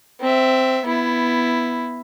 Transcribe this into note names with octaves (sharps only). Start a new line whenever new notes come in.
C4 E5
B3 E4